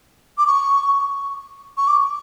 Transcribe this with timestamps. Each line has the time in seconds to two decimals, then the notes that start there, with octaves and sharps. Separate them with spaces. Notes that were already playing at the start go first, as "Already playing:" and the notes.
0.38 D6
0.47 C#6
1.77 C#6
1.88 D6